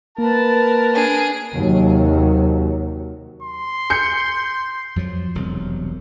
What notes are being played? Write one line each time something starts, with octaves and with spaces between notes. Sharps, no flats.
A#3 A#4 B4 A5
D4 G#4
D#2 C3 F#3
C6
G6 C#7
F2 F3 F#3
E1 C2 F#3